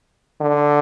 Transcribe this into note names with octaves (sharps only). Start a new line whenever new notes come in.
D3